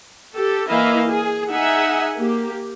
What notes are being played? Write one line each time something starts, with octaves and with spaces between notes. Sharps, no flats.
G4 A4
E3 A#3 E4 D#5 F5
G#4
D#4 G#4 E5 F#5 G#5
A#3 G4